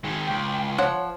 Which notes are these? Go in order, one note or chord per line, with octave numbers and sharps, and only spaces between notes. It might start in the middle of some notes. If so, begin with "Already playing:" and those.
D#3 G#3
C#2 G5
F3 C#5 F#5